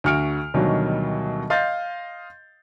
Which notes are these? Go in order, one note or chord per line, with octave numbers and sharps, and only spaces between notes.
D2 F#4 F6 C#7 D7
D2 B2 D#3 F#3 G3
D#5 F5 C6 G6 A6